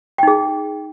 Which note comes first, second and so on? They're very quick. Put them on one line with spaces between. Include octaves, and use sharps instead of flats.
G5 D#4 G#4